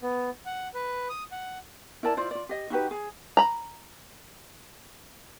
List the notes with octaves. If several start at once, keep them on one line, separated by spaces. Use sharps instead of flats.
B3
F#5
B4
D#6
F#5
E4 A#4 D5 A5
E4 F4 C5 D5
F4 D5
G4 D#5
D#4 F#4 G4 B4
G#4
A#5 B5